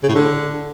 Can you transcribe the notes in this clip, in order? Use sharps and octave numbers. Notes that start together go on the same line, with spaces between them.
C#3
A2
D3